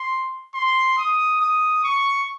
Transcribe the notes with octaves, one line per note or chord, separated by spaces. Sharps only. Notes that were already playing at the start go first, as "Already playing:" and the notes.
Already playing: C6
C6
D#6
D#6
C#6